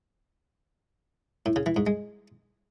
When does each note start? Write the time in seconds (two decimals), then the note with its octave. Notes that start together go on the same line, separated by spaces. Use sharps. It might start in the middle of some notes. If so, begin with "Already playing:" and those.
1.46 A2
1.56 C#3
1.66 E3
1.76 G#2
1.87 G#3